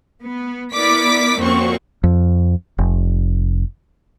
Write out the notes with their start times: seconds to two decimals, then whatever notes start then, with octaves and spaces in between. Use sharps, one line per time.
0.22 B3
0.74 B3 E4 A#4 D5 D6 B6
1.39 F2 A#2 C4 C#4 F#4 C#6
2.04 F2
2.78 F1